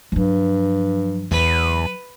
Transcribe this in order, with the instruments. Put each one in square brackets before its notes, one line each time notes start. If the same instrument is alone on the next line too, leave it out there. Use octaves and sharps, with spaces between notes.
[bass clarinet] G2 [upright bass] F3 F#3
[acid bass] E2 [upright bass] F#3 [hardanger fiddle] B4